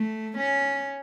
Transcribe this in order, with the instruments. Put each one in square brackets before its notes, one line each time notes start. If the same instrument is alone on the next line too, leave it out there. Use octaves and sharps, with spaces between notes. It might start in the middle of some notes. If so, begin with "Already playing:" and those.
Already playing: [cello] A3
C#4